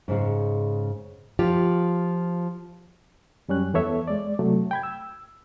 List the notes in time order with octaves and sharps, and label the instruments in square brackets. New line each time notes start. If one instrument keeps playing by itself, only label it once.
[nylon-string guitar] G#2 C#3 G#3
F3 F4 G4
[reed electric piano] F#2 G3 C#4 F#6
E2 B3 A4 C#5 E5
G#3 D5
C3 F#3 A3
G5 B5 G#6
E6